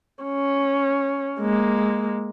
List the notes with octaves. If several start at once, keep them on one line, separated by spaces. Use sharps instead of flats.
C#4
G#3 A#3